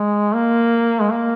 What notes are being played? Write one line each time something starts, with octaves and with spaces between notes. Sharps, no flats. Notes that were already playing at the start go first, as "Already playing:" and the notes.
Already playing: G#3
A#3
G#3
A#3